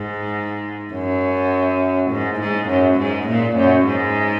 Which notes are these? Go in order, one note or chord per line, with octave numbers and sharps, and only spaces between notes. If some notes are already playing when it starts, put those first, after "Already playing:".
Already playing: G#2
F#2
G#2
G#2
F#2
G#2
A#2
F#2
G#2